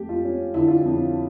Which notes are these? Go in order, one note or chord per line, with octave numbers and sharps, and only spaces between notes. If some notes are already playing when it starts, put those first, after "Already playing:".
Already playing: F2 A3 G4
F4
C#4
D3 E4
F4
F2 E4